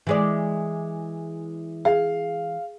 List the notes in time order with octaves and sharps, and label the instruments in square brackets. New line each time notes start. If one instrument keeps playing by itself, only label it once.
[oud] E3 G#3 D5
[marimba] G#4 [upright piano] F5